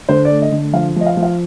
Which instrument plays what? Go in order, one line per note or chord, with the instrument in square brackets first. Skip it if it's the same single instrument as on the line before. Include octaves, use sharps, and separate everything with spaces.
[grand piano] D3 C5
A3 D5
D#5
D3
F3 F5
F3 D#5
F5
F3
F5